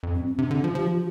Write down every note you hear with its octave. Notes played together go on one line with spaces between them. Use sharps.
F2
G2 C4
C4
C3 D4
C4
D3 D4
F3 F4
F3 G4
F4